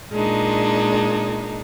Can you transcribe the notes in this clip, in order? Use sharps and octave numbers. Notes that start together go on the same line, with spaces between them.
A#2 G#3 D4 D#4